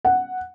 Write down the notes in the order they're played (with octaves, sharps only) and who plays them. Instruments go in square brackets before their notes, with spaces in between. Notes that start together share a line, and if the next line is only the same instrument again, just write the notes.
[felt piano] F#5